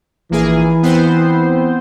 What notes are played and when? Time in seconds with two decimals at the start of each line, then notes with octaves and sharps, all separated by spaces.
0.31 A#1 E3 A#3 G#4
0.83 B3 C4 C5